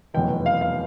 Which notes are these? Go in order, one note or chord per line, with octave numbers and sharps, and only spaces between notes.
F1 E2 B2 F#3 G5
F5
F5